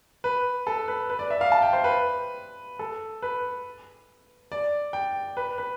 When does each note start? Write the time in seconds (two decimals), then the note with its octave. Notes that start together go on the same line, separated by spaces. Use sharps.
0.24 B4
0.67 A4
0.88 B4
1.10 B4
1.19 D5
1.31 E5
1.41 F5
1.52 A5
1.62 G5
1.73 C5
1.84 B4
2.79 A4
3.22 B4
4.52 D5
4.93 G5
5.37 B4
5.58 B4